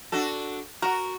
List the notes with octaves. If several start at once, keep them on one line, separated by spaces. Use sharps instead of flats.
D4 F#4 A4
F#4 A#4